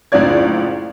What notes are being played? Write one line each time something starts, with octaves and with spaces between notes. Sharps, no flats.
F#1 C#2 A2 D4 D5 G#6